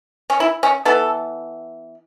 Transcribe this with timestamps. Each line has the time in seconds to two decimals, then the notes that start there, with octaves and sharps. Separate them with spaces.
0.30 C#4
0.40 E4
0.63 C#4
0.85 E3 B3 A4